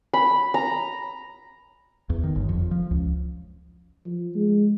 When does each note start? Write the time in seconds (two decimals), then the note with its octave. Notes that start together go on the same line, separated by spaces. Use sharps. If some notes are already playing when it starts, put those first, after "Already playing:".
0.14 B5
0.54 A#5
2.10 E2
2.24 D#3
2.36 G1
2.49 F2
2.71 F3
2.91 C#2
4.06 F3
4.35 G#3